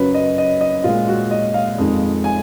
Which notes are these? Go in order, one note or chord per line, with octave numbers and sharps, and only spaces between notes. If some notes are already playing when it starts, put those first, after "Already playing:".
Already playing: F#2 C#3 F#3 B4
D#5
D#5
D#5
A#2 G#3 F4
F#4
D#5
F5
F2 D#3 G#3
G#5